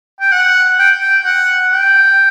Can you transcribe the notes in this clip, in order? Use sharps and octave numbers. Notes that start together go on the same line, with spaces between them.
G5
F#5
G5
G5
F#5
G5